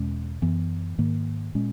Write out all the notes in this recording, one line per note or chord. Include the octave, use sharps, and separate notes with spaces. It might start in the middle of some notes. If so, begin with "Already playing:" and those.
Already playing: E2 B2 G#3 C#4
F#2 E3 B3
G#2 D#3 A#3
A#2 G#3 C#4